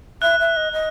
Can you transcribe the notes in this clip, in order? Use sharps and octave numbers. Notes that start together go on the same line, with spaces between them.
E5 F#6
E5
D#5
D#5